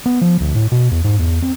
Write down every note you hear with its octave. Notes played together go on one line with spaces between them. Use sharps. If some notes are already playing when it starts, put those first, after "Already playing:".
B3
F3
D2
A2
B2
E2
G#2
E2
C4